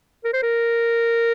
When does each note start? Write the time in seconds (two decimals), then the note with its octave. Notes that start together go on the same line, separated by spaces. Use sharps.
0.24 A#4
0.33 C5
0.43 A#4